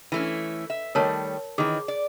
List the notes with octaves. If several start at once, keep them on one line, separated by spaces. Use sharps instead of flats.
E3 A3 C#4
E5
D#3 G3 A3 A#4 C#5 A5
D#3 E3 G#4
D5